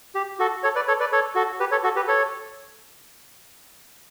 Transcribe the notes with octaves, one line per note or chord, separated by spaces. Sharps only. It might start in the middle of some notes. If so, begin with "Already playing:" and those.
G4
F#4 A4
A4 C#5
B4 D5
A4 C#5
B4 D5
A4 C#5
F#4 A4
G4 B4
A4 C#5
F#4 A4
G4 B4
A4 C#5